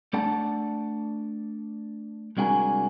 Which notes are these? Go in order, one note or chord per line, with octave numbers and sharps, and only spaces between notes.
A3 D4 A4 D5 F#5 A5
C2 G#3 D4 F#4 A#4 G#5